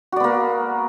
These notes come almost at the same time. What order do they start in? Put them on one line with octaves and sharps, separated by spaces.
F#4 D5 B3 A#3